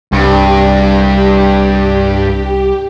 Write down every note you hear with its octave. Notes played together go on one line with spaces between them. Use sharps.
C2 G2 G4